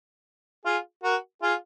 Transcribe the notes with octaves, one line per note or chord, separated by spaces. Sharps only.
F4 G#4
F#4 A#4
F4 G#4